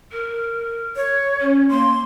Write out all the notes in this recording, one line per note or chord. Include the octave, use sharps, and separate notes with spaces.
A#4
C#5
C#4
A#3 C6